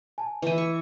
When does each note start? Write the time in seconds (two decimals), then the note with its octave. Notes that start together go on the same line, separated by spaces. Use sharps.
0.18 G#5 A5
0.42 E3 E4 B4 D#7
0.58 C#6